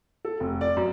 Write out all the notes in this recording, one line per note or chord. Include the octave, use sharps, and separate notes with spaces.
A4
F1
D5
F#2